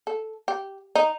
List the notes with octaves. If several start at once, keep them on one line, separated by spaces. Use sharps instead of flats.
A4
G4
D#4